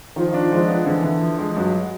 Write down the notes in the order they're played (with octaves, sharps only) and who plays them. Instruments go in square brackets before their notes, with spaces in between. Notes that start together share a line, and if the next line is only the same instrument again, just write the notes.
[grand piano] D#3 [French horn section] F3
[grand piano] D4
[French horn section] F3 [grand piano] G#3
[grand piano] B3
[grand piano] D3 [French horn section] E3
[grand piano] D3
F3
G#3
[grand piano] G2 [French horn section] F#3